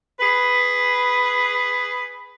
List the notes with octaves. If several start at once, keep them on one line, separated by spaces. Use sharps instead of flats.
G#4 B4